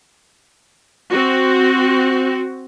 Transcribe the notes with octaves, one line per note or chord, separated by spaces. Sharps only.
C4 F#4